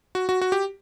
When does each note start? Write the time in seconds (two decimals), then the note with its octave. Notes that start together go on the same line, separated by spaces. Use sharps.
0.15 F#4
0.29 F#4
0.41 F#4
0.52 G4